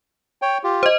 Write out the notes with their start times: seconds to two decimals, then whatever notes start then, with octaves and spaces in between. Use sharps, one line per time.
0.42 C#5 G5
0.64 F4 G4
0.83 C5 D#5